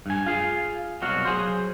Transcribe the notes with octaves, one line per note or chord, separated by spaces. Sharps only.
G2 G#5
F4 G#4
C2 B2 F#3 F#4 F5
F#3 G#4 C5